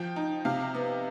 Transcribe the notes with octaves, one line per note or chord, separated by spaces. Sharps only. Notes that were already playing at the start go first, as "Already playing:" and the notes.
Already playing: F3 G5
D#4
C3 F5
B3